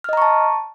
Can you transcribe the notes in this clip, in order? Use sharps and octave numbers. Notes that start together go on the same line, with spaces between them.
D#5 A5 A#5 C#6 F6